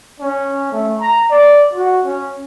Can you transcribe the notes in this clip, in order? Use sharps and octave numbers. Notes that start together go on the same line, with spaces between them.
C#4
A3
A#5
D5
F#4
C#4